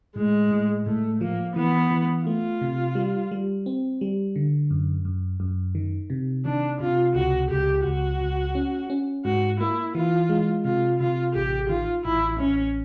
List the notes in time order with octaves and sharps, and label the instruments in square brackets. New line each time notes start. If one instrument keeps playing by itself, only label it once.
[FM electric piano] A2 [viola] G#3
[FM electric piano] A2
[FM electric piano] A2 [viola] A3
[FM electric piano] F3 [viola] A#3
[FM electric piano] E3 [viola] B3
[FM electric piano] E3
[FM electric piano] A3 [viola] F4
[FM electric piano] C3
G3
G3
C4
G3
D3
F#2
F#2
F#2
D#3
C3
[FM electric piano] D#3 [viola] D4
[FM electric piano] C3 [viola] F4
[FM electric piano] C#2 [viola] F#4
[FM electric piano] C#2 [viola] G4
[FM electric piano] C#2 [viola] F#4
[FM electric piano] C#2
C#4
C#4
[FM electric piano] G#2 [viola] F#4
[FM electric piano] A#3 [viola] E4
[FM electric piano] E3 [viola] F4
[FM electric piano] G#3
[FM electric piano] C3 [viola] F4
[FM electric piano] C3 [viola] F4
[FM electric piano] A1 [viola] G4
[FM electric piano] D#3 [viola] F4
[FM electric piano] A1 [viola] E4
[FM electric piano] A1 [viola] C#4